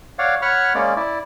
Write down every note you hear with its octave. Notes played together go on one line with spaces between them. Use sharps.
C#5 D5 F5 F#5
C#5 F#5 B5 C#6 F6
G#3 A#3 C#4 D5
E4 D5